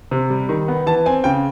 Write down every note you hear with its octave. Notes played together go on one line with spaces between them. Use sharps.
C3
G3
D#3
B3
E3 A5
C4 G#5
C#3 G5